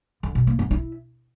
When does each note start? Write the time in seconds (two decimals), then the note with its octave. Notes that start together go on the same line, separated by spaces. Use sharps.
0.23 D3
0.35 B2
0.47 A#3
0.59 B3
0.71 E4